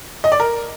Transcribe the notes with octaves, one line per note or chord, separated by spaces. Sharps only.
D#5
D5
A#4